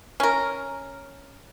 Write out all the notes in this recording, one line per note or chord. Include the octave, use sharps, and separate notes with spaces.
C#4 A#4